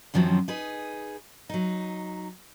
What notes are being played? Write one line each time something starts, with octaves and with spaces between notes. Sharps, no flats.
F#2 D#3 F3 F#3 C4 C#4
D#4 G#4 B4
F#3 D#4